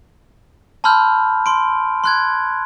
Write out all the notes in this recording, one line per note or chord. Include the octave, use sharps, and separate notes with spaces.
A5 B5 C6 E6 F6 G6
C6 D7
C6 F#6 G#6